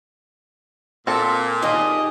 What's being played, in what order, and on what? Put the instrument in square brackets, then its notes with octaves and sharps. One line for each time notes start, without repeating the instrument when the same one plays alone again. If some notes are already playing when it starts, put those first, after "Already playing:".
[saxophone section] A#2 [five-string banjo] C4 A4
[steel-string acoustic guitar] D#3 G4 G#4 [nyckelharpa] D#5